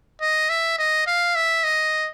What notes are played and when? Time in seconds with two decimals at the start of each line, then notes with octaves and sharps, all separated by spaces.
0.21 D#5
0.50 E5
0.79 D#5
1.07 F5
1.35 E5
1.64 D#5